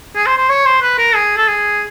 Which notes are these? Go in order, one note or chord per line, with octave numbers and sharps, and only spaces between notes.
G#4
C5
C5
C#5
C5
B4
A#4
G#4
A4
G#4